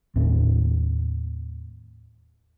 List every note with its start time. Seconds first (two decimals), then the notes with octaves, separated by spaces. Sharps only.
0.16 D#2 A2 C4